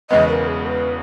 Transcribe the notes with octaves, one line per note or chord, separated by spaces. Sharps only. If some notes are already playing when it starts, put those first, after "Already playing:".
E1 E2 C#3 G#3 B3 D#5
A#4
G#4
B4